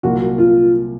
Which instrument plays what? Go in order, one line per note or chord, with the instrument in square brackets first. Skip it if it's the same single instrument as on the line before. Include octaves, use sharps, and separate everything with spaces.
[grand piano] C2 A#2 F#3 [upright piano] F#4
[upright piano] F4